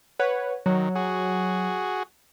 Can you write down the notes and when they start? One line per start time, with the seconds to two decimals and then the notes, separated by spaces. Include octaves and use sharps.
0.19 B4 C#5 F#5
0.66 D#3 F#3
0.95 F#4 G#4